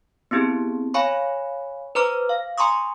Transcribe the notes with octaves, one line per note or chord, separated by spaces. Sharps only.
B3 C4 E4 G4 G#4
C#5 F5 G#5 B5 C#6
B4 C5 A#5 D6 F6
F5
G#5 A#5 C6 C#6 D#6